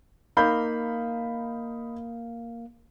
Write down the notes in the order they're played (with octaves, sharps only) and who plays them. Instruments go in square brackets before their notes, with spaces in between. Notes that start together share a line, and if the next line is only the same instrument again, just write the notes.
[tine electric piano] A#3 F5 [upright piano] D#4 B5 G6